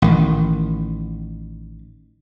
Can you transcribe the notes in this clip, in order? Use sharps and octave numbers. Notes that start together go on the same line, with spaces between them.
A1 D#3